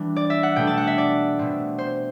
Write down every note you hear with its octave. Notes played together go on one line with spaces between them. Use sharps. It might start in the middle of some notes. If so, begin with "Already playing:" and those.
Already playing: E3 G3 D4
D5
E5
F#5
B2 A3 D4 G5
A5
F#5
E5
D5
B2 A3 C4
C5